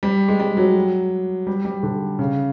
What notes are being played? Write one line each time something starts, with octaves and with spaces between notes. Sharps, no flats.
G3
G#3
G3
F#3
G3
G3
D3
C#3